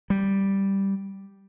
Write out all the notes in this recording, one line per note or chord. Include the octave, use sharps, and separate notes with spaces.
G3